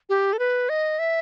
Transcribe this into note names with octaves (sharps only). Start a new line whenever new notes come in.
G4
A4
B4
D#5
E5